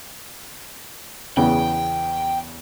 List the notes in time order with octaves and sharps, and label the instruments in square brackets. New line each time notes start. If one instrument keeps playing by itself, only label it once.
[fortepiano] E2 C#3 B3 [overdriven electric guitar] G5